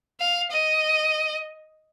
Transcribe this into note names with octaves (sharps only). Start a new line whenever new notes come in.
F5
D#5